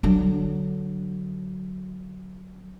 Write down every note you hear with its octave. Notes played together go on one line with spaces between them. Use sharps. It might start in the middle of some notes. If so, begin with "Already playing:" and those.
D3 F#3